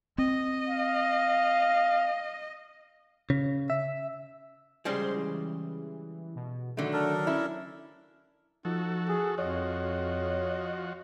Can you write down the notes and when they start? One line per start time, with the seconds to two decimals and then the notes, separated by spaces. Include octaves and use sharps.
0.18 C4 D#5
0.69 F5
3.30 C#3
3.70 E5
4.85 C#3 G3 G#3 C5 C6
5.15 E3
6.35 B2
6.77 D3 D#3 F#3 A3 F#4
6.93 D4 A4 A#4
7.27 C#4 E4
8.65 F3 D#4 F#4 A4
9.09 G#4
9.38 F2 F3 F#4 C#5 D#5